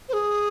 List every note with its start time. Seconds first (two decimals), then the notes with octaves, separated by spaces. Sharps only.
0.08 C5
0.13 G#4